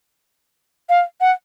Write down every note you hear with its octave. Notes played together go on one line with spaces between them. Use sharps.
F5
F#5